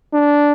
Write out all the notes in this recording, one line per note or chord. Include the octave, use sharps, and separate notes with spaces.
D4